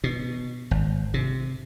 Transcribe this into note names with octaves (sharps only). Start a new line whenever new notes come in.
B2
G#1
C3